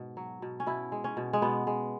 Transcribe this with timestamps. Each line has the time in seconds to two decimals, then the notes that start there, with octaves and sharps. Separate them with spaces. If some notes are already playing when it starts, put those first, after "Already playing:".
Already playing: G#2 B2
0.17 F#3
0.42 B2
0.60 C#4
0.67 B2 E4
0.92 G#3
1.04 C#4
1.17 B2
1.33 G#3
1.42 B2 B3
1.67 G#3